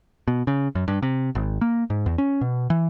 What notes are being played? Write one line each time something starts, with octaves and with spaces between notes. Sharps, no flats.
B2
C#3
F#2
G2
C3
G#1
A#3
G#2
E2
C#4
B2
E3